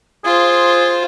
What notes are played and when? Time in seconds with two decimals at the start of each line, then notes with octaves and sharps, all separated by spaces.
0.25 F4 G#4 C5